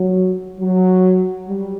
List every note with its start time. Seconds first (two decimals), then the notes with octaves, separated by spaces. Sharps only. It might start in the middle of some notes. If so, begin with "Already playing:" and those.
Already playing: F#3
0.59 F#3
1.48 G3